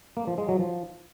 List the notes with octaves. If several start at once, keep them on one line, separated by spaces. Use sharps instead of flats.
A#3
F3
G#3
F#3
F3